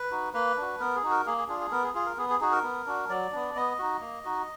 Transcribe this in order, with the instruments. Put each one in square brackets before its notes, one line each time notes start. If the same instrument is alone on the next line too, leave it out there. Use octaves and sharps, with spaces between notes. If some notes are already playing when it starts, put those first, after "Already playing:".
Already playing: [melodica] B4
D#4 F#4
A#3 B4
D4 F#4
B3 A#4
G#4
D#4 F#4
A#4
A#3 G#4
G#4
D4 F4 G#4
G#4
B3 A#4
G#4
F4 G#4
A#4
B3 G#4
G#4
D#4 F#4 G#4
A#4
B3
D4 F#4
F#3 D5
B3 D4
B3 D#5
D#4 F#4
A#3
D#4 F#4